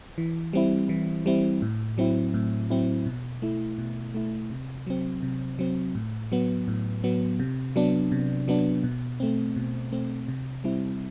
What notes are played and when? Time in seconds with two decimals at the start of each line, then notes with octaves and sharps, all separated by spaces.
0.18 E3
0.53 G3 C4 E4
0.89 E3
1.26 G3 C4 E4
1.62 A2
1.98 F#3 C4 E4
2.34 A2
2.70 F#3 C4 E4
3.06 B2
3.42 A3 E4
3.78 B2
4.15 A3 E4
4.51 C3
4.87 F#3 C4
5.23 C3
5.59 F#3 C4
5.95 A2
6.32 F#3 B3
6.68 A2
7.04 F#3 B3
7.40 C3
7.76 F#3 B3 D4
8.12 C3
8.48 F#3 B3 D4
8.84 B2
9.20 A3 C4
9.56 B2
9.92 A3 C4
10.28 C3
10.64 G3 C4 E4